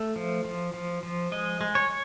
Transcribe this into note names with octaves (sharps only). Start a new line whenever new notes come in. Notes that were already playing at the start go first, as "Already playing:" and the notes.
Already playing: A3
F3
F3
F3
F3
G#3 D#5
G#3
C#5